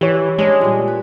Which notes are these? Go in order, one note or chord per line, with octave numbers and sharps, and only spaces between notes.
E3 G4 C#5
G#3 C#4 D4 G#4
A#2 G3
B4